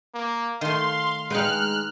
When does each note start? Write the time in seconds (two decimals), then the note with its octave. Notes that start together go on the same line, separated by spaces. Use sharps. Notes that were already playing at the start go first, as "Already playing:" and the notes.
0.14 A#3
0.61 D#3 A3 F5 C6
1.30 G#3 D#4 B4 G5 F6 F#6